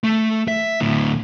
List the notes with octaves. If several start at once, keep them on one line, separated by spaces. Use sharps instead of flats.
A3
E5
D2 A2